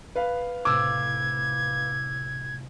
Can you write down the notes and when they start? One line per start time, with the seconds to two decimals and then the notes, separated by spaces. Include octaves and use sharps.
0.15 B4 F5
0.65 A2 C3 A3 D6 E6 G#6